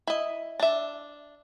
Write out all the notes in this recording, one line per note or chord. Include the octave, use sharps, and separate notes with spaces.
E4 D#5
D4 E5